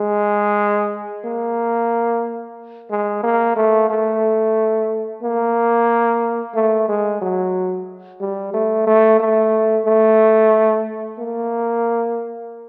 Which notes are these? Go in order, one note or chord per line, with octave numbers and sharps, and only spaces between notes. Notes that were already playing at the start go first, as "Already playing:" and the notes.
Already playing: G#3
A#3
G#3
A#3
A3
A3
A#3
A3
G#3
F#3
G3
A3
A3
A3
A3
A#3